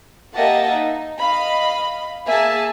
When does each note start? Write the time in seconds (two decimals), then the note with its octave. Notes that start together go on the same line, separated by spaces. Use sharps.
0.35 A#3 G4 D#5 E5 F#5 A5
0.69 D#4
1.20 D#5 F5 B5
2.27 A#3 G#4 E5 G#5 A5